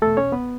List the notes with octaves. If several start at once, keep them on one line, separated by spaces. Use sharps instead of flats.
E2 B2 A3 A4
C#4 C#5
B3 B4